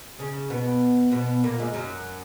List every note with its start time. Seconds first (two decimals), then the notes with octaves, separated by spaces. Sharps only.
0.19 C#3 C#4
0.50 B2 B3
1.12 B2 B3
1.44 A#2 A#3
1.59 G#2 G#3
1.74 F#2 F#3